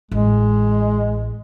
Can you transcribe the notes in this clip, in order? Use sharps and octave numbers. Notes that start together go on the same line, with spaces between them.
A1 G#3